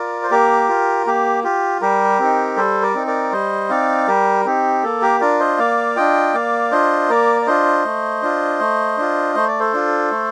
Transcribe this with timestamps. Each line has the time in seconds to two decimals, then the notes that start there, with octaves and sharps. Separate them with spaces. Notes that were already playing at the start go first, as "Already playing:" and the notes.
Already playing: F4 A#4 D5
0.23 C5
0.31 A#3 G4 A#4
0.69 F4
1.07 A#3 G4
1.44 F4 G4
1.81 G3 G4 A#4
2.19 C4 D#4
2.56 G3 A4 C5
2.82 A#4 D5
2.95 C4 D#4
3.07 A#4 D5
3.32 G3 C5 D#5
3.70 C4 D#4 D5 F5
4.08 G3 G4 A#4
4.45 C4 D#4 G4
4.83 A#3 A4
5.02 G4 A#4
5.21 D4 F4 A#4 D5
5.39 C5 D#5
5.59 A#3 D5 F5
5.96 D4 F4 D#5 G5
6.34 A#3 D5 F5
6.72 D4 F4 C5 D#5
7.09 A#3 A#4 D5
7.42 D5
7.47 D4 F4 C5 D#5
7.85 A3
8.22 D4 F4
8.60 A3
8.97 D4 F4
9.35 A3 C5
9.48 D5
9.60 A4 C5
9.73 D4 F4
10.11 A3